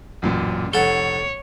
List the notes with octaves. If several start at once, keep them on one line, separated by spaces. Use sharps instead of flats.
A1 F#2 A#2
F1 A4 C#5 F#5 G7